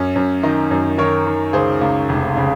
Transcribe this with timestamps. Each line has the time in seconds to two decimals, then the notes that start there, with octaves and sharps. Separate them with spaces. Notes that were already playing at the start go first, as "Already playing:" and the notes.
Already playing: F#2 C#4
0.16 F#2
0.43 D#3 D#4
0.71 F#2
0.98 D#3 A#4 C#5
1.26 D#3
1.53 C#2 G#4 C5
1.81 C#2
2.09 F1
2.37 C#3